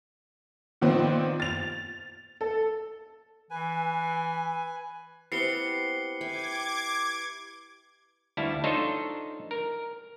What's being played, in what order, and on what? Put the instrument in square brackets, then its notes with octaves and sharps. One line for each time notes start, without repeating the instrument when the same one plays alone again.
[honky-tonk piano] A#2 D#3 B3 C4
A6 F7
A4
[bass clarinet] E3 [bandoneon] B4 G#5
[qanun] B3 C4 [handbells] E4 G4 B4 [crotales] C7 C#7 G7
[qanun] E5 G5 G#5 [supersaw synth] D6 G#6
[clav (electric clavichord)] D2 G3 E4 F5 A5
D4 D#4 F4 A4 C5 C#5
A#4